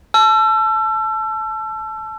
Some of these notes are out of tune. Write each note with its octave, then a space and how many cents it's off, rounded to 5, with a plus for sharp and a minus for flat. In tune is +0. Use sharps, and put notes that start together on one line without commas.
A5 -20 E6 +35